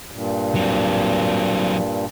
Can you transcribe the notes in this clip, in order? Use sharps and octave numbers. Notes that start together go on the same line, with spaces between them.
G2 A#2
F#3 C4